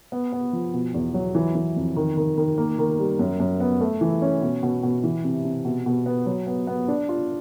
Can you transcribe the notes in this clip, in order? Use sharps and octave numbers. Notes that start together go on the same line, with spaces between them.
B3
B3
F3
B2
E2
F#3
E3
E3
F2
D#3
D#3
D#3
A#3
D#3
G3
F#2
F#2
B3
A3
E3
C#4
B2
B2
B2
E3
C3
C3
B2
B2
B3
F#3
B3
B3
D4
F4